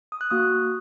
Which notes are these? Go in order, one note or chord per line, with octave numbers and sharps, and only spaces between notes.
D#6
F#6
A#3 F#4 D#6